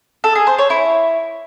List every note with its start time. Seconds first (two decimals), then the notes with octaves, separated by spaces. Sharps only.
0.24 A4
0.35 G#4
0.47 C5
0.58 C#5
0.70 E4